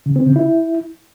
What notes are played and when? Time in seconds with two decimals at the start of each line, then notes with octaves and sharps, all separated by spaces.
0.06 C#3
0.16 C4
0.26 C#3
0.36 E4